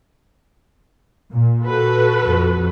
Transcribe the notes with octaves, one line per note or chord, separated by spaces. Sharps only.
A#2
F#4 A4 B4
F2